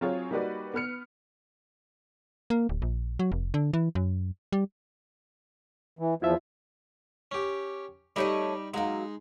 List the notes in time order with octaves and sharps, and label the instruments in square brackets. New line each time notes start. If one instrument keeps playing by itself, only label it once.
[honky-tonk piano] F#3 C4 F4 G#4 C#5
G3 A#3 D#4 F#4 B4 D5
B3 B4 F6 C#7
[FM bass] A#3
D1
A#1
F#3
F1
D3
E3
F#2
G3
[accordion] E3
[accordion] E2 F3 [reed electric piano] E4 F4 E5
[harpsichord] C#4 G4
[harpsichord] G3 D#4 G4 [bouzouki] A3 C#5 D#5
[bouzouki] F#3 A#3 [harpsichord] G#3 D#4